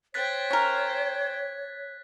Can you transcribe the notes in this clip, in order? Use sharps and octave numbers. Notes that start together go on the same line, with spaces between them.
C5 C#5 G5 F#6 A6 B6
C#4 A#4